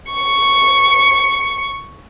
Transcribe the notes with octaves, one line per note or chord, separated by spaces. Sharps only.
C#6 C#7